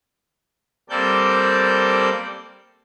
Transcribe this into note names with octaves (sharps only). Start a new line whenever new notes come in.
G3 A#3 C4 A4 D5 G6